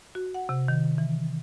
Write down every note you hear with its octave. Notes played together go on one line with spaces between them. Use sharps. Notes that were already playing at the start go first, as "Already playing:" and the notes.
F#4
F#5
C3
D#3
E3